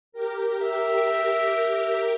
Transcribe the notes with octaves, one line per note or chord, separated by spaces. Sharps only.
G4 A#4
E5